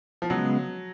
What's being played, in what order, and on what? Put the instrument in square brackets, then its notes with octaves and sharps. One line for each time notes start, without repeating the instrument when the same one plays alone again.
[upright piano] F3
[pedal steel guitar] C#3 G#3 B3 [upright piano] F#3